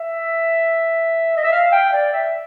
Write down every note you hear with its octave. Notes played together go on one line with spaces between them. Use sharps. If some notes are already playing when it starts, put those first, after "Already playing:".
Already playing: E5
D#5
E5
F5
G5
D5
E5